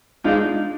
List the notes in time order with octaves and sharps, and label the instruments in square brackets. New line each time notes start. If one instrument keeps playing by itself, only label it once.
[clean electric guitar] G#3 D#4 [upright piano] D4 F4